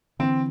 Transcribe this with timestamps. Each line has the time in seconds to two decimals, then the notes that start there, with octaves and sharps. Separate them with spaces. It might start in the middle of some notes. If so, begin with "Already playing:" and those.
0.19 D3 E3 C4